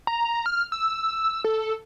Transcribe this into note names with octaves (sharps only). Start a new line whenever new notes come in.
A#5
F6
E6
A4